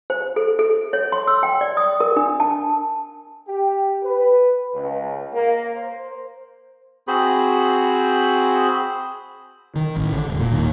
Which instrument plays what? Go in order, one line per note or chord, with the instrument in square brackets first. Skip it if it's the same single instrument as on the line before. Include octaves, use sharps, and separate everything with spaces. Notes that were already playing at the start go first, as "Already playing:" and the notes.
[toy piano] C5
A4
A4
C#5
C6
E6
G5
D5
D#6
A#4
D4
A5
[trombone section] G4
B4
C#2
A#3
C5
[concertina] C4 F#4 G#4 C5 B5
[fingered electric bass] D#3
A1
D3
E1
A#2
D#2